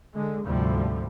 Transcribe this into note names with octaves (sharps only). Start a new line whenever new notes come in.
D3 G#3
D2 G#2 C3 F3 G3